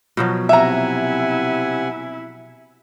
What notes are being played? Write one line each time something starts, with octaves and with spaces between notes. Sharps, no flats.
B2 F3 F#3
C3 E4 E5 F#5 G#5 A#5